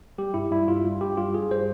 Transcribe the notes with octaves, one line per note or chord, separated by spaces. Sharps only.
G3 G4
G2 E4
G3 E4
G2 F4
G3
G2 G4
G3 F4
G2 G#4
G3 C5